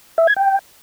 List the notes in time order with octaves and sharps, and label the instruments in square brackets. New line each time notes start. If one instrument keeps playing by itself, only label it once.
[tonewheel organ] E5
G#6
G5